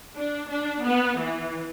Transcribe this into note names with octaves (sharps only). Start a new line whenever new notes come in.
D4
D4
B3
E3